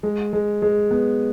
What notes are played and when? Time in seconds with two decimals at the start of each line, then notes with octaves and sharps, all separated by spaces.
0.03 G#3
0.33 G#3
0.62 G#3
0.91 B3